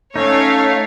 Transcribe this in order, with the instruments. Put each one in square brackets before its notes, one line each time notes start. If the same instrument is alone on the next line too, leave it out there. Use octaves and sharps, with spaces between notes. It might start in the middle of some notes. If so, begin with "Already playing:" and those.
[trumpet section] A3 [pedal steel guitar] C#4 D#4 [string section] C#5 F5